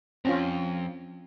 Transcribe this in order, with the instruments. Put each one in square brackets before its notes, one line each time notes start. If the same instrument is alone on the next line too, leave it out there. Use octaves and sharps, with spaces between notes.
[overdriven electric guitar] F2 [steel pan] C4 C#4 F4